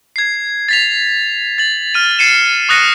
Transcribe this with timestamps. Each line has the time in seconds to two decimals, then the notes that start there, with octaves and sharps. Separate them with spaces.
0.16 G#6 C7
0.69 A6 B6 F7
1.58 A6 F#7
1.94 F6 D#7
2.19 A6 C7 C#7 D#7 E7
2.69 C#6 D#6 F#6 A#6 C#7 D#7